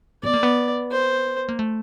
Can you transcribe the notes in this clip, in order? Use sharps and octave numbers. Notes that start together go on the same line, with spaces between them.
B3 D5
A#3
B3
C5
A#3
A3